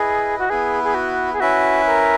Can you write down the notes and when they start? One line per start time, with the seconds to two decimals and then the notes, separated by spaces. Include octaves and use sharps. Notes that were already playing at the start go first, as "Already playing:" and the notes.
Already playing: E4 G#4 B4 D#5
0.39 F#4
0.50 B3 E4 G#4 B4
0.84 G#4
0.94 F#4
1.33 G#4
1.40 C#4 E4 F#4 B4 E5
1.86 A#4